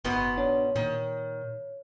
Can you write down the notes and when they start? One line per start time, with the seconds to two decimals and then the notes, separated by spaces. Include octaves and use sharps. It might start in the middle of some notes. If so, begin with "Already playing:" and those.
0.04 F#1 G#2 B2 B3
0.38 D4 C#5
0.76 A#2 D#3